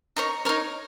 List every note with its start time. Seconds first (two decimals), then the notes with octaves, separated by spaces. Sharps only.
0.16 D#4 A#4 C#5 A#5
0.45 D#4 A#4 C#5